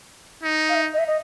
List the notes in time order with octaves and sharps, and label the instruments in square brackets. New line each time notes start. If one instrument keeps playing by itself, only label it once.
[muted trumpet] D#4
[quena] F5
E5
D#5
E5
D#5